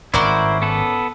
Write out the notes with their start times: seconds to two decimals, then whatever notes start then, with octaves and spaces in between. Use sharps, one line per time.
0.14 G#1 A2 C#4 E4 A#4 C5 D5 F#5
0.62 B3 A4 B4